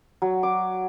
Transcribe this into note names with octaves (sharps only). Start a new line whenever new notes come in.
F#3
D6